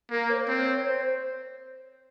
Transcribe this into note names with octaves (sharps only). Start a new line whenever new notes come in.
A#3 A#4
C#5
C5
C4
C#5
C#5
C5